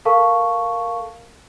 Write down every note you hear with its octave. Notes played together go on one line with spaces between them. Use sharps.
A4 A#4 F5 A5 C#6